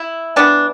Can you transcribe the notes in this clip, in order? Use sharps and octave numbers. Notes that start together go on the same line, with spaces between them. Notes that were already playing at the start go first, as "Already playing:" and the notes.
Already playing: E4
E3 B3 D4